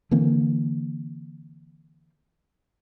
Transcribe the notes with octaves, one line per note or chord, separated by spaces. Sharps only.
D3 E3 A#3 C4